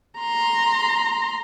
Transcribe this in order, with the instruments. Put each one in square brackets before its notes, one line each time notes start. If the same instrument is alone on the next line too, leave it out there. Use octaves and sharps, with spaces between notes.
[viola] A#5 C6